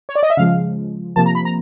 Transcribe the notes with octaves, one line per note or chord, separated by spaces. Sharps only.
C#5
D5
D#5
E5
C#3 F3 G#3 F5
C3 F3 A#3 A5
A#5
B5
A#5